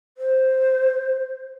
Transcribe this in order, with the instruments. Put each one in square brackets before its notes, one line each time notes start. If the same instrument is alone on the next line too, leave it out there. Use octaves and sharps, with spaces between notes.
[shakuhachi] C5